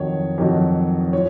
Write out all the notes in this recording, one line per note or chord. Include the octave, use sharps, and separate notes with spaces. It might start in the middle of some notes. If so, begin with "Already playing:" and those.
Already playing: F2 D#3 F#3 C#5
F2 D#3 F#3
F3 C#5